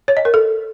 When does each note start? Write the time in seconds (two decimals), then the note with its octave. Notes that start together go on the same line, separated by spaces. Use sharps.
0.08 C#5
0.17 D#5
0.25 A#4
0.34 A4